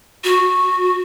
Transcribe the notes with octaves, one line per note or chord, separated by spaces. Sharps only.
F#4